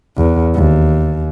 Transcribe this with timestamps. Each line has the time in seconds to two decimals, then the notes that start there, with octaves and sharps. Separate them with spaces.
0.17 E2
0.54 D#2